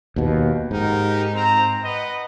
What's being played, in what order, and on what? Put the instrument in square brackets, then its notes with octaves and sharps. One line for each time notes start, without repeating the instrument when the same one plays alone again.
[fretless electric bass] D#2 B2
[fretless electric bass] G#2 [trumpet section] D#4 G4 A#4
[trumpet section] C4 A#5
B4 D#5 F#5